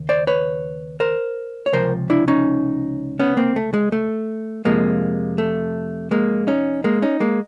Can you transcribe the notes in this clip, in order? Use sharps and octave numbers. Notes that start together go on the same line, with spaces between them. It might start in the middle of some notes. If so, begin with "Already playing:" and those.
Already playing: D#2 C#3
C5 D5
B4 C#5
A#4 C5
C#5
C#2 C3 F3 A#4 C5
D4 E4
C#4 D#4
B3 C#4
A#3 C4
A3
G#3
A3
F2 C3 F3 G#3 A#3
A3
G#3 A#3
C#4 D#4
G#3 A#3
C#4 D#4
G#3 A#3